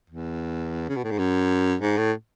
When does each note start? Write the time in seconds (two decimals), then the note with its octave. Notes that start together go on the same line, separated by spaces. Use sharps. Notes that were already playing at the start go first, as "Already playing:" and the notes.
0.10 E2
0.89 C#3
0.96 B2
1.04 A2
1.11 G#2
1.18 F#2
1.81 G#2
1.98 A2